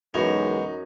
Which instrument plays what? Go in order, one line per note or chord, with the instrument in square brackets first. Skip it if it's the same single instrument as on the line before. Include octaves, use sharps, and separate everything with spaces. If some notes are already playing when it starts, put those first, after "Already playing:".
[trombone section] B1 G#3 [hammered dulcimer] F#2 [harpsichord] B2 E3 [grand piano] D#4